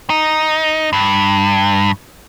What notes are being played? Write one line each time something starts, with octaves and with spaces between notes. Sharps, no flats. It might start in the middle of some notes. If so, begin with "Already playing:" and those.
D#4
G2